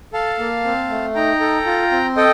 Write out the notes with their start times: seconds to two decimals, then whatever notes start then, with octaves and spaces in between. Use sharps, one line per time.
0.13 A4 F5 A5
0.39 A#3
0.65 C4
0.90 A3
1.15 D#4 G5 A#5
1.40 A4
1.66 F4
1.92 C4
2.16 A4 D#5 G5